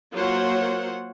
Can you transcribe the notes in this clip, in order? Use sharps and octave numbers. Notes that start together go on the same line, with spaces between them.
F#3 A#3 F4 C5 C#5 F#5